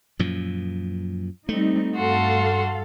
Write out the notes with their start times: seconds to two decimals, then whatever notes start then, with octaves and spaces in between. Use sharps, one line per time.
0.19 F#2 A#2 F3
1.49 G3 A3 C4 D#4
1.96 G2 F#4 A4 F5 C6